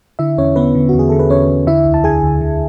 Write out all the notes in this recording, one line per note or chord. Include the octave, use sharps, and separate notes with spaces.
D3 E4 E5
E2 C#4 C#5
D3 B3 B4
D3
E2 F#4
G#4
D3 A4
B4
E2 C#4 C#5
E2
D3 E4 E5
D2
A5
D3 G#4 G#5
D2
D3